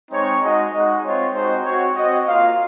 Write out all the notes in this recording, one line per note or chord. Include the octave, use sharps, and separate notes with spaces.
G#3 C4 D#4 C#5
G#3 D#4 F#4 D#5
G#3 D#4 F#4
C4 F4 C#5
G#3 C4 D#4 F#4 C5
C4 F#4 C#5
C4 F#4 D#5
A#3 F4 F5